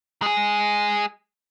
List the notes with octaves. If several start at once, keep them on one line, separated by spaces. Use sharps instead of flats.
G#3 G#4